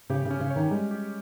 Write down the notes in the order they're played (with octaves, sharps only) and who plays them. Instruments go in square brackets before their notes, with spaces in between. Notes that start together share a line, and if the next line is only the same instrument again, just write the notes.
[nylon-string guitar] C#3 [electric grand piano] G4
[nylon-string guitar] C#3
[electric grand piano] C#4
[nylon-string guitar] C#3
[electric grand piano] C#5
[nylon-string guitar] D#3
[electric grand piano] G3 [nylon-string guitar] G#3
[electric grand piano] G4